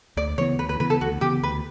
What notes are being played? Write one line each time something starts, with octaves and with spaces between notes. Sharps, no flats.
D2 D5
C#3 E3 B3 C#5
D2 B4
B4
C#3 E3 B3 B4
A4
D2 F#4
C#3 E3 B3 G4
D2 B4